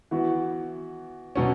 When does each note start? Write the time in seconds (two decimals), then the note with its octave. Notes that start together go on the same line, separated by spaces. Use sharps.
0.11 E3 B3 F#4
1.36 B2 F#3 C#4